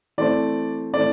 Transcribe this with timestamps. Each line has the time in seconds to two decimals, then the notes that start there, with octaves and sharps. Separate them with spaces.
0.18 E3 A3 C4 D5
0.93 E3 A3 C4 D5